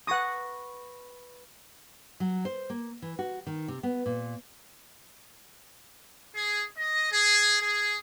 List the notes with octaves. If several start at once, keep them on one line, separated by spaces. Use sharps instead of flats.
B4 F#5 C#6 D#6 A#6
F#3
C5
A#3
E3
F#4
D#3
C3
B3
A#2
G#4
D#5
G#4
G#4